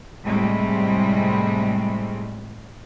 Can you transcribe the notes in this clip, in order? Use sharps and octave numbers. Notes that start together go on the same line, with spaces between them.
A2 C3 G3 G#3